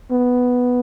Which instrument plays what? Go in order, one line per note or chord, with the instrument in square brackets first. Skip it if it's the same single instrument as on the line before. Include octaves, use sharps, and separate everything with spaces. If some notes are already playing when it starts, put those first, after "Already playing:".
[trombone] B3